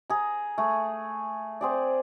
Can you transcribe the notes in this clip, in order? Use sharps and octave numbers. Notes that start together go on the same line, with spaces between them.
G#4 A#5
A3 G#4
C4 G#4 D5